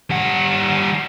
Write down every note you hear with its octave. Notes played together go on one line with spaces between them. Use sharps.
G3 F#5